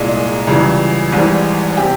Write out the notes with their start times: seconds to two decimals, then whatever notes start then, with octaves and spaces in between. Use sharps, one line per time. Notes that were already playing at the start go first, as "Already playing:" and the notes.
Already playing: C2 A#2 G#3
0.15 G#4
0.47 C#2 C#3 E3 G3
1.12 G#1 G#2 E3 G3
1.77 C3 G4